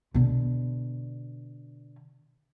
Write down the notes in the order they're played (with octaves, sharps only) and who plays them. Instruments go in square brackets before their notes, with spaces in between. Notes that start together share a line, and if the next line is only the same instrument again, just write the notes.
[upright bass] B2 D3